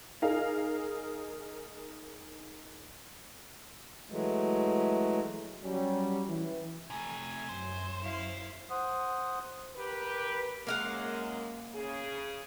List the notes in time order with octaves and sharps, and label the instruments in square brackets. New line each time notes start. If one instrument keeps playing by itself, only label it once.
[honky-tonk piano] D#4 G#4 A#4 F5
[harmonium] E3 F#3 G#3 A3
[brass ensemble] F#3 G3 C#4
E3
[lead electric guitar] C3 A3 [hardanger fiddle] G#5
[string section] F#2 [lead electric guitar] C5
[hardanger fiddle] E4 F5
[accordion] C5 F#5 D#6
[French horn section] G4 A#4 B4
[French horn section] F#2 G#3 [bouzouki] A#3 F5 F#5
[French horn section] C#3 G#4